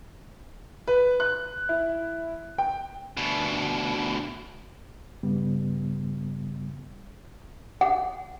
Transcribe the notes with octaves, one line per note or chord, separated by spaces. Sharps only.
B4
F#6
E4
G5
D2 B2
G2 C#3 G3 B3
F#5